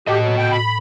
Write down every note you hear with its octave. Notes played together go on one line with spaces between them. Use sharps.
A2 F#4 G4 D#5
F#3
G5
B5